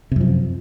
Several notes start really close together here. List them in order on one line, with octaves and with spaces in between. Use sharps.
C3 F#2 F3